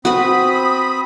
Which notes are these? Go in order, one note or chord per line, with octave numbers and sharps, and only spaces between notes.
C4 F#4 B4 B5 D#6